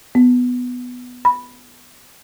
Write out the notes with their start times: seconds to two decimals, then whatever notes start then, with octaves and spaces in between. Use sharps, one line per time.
0.15 B3
1.25 B5